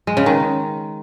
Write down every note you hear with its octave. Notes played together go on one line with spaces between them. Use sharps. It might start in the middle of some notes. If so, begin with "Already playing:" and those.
G#3
C#3
D#3